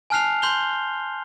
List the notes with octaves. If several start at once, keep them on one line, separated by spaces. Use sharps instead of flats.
G#5 A5 F6 F#6 C7 F7
C6 G6 F7 G7